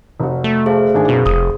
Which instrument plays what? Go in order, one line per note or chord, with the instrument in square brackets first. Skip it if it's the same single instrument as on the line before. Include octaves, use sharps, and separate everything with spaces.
[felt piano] F1 F#4
[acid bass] A3
[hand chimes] G#4 C5 F5
[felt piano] G#1 D4 G#5
[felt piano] F#2 [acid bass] B2
[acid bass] F1 [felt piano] D#6